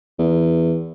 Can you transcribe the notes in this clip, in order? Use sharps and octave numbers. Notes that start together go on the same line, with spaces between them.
E2